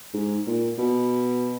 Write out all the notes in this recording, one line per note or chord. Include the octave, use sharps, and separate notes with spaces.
G#2
A#2
B2